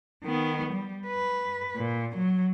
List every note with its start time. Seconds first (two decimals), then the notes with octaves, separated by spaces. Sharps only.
0.24 D#3 B3
0.73 G3
1.07 B4
1.77 A#2
2.17 F#3